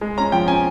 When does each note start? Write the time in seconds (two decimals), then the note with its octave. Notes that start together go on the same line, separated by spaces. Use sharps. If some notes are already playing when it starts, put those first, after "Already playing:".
0.01 G#3
0.18 C#4 A#5
0.32 F3 G5
0.48 C#4 G#5